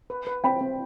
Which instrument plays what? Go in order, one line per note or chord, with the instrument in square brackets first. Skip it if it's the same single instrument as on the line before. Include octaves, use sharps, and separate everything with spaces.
[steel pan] B4
B4
[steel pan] C4 [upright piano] G5 B5
[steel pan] C4